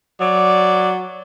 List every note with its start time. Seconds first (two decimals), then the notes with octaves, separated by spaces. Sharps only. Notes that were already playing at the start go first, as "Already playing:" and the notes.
0.20 F#3 D5